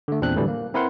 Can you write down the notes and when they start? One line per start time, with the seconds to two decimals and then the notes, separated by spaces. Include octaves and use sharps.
0.08 D3 A3
0.21 E2 A#2 C4 D4 F#6
0.36 A2 D3 E3 F#3 G3
0.48 A#3
0.74 C4 E4 A#4 B4 F#5 C6